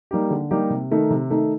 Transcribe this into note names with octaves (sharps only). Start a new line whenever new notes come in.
G3 A#3 D#4 G4
D3
G3 A#3 D#4 G4
C3
D#3 A3 D#4
C3
D#3 A3 D#4